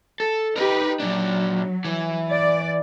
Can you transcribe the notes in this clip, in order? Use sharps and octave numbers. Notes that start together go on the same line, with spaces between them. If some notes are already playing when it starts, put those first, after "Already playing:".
A4
D#4 G4 A#4 B4
A#2 F#3 D4
E3
D5